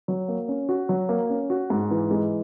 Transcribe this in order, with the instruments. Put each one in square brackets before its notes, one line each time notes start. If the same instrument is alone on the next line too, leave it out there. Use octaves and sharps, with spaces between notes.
[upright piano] F#3
A#3
C#4
F#4
F#3
A#3
C#4
F#4
G#2
E3
G#3